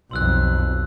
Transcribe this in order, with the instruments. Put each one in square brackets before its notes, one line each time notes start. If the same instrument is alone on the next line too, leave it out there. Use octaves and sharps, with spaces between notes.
[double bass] B1 F2 [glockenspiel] C6 E6 F#6